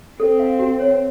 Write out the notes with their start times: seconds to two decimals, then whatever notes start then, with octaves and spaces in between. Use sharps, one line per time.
0.20 C4 A4
0.39 F5
0.59 F#4
0.80 C#5